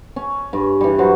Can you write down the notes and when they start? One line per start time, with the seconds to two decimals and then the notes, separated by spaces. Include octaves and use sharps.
0.16 C#4
0.53 G2
0.81 E3 G3
0.99 F#3 B4 C5